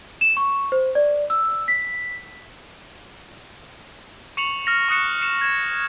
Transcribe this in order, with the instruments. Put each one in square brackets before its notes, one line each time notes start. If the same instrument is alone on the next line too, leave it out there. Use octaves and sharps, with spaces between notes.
[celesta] E7
C#6
C5
D5
E6
B6
[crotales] C#6 C#7 F7 F#7
F6 A#6 F7
C#6 D#6 F#6 C#7 E7
C#7 E7 F7
G#6 E7